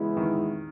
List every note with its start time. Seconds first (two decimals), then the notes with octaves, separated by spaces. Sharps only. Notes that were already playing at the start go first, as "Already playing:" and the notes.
Already playing: C#3 E3 G#3 B3 E4
0.17 D#3